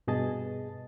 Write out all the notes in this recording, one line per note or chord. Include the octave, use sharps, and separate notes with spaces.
G2 B2 G#4 D#5 A5 A6